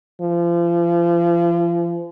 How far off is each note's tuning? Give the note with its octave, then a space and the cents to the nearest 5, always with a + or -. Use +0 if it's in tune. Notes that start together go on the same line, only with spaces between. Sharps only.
F3 -35